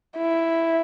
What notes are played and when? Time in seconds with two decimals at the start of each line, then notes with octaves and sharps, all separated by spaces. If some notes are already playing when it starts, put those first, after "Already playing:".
0.17 E4